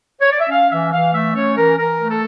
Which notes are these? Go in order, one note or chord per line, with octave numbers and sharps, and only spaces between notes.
C#5
D5
E5
C#4 F5
E3 E5
E3 F5
A3 E5
C#4 C#5
E3 A#4
E3 A#4
A3
A4